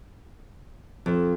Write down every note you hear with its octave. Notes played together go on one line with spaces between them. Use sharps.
F2